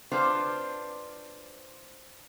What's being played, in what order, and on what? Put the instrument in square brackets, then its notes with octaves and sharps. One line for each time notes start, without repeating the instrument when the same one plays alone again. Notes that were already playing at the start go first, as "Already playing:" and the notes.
[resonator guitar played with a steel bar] C4 D4 F4 B4 C5